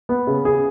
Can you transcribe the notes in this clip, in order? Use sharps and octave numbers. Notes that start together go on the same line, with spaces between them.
B3
C#3
G#4